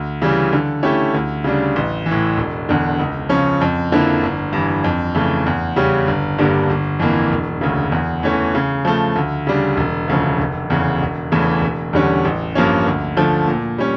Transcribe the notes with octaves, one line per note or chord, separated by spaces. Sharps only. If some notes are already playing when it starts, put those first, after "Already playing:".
Already playing: D2
C#3 E3 G3
D3
A3 C#4 E4 G4
D2
C#3 G3 D4
A1
E3
A2
E1
E2 D3
C#2
C#3 F3 C#4
F2
D3 F3 A#3 E4
G1
G2 E3
F2
C#3 E3 A3
E2
C#3 G3 C#4 G4
G1
G2 D3 G3 A#3
G1
F2 E3 A#3 E4
E1
D2 C#3
E2
E3 A3 C#4
C#3
F3 A3
D2
C#3 G3 D4
E1
D2 C#3 F3
F1
E2 C#3
E1
E2 C#3 E3 A3
E1
E2 D3 G3 C#4
A1
G2 F3 A#3 C#4
D2
D3 F3 A3
A#2
G3 C#4